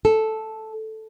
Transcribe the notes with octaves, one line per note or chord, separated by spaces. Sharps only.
A4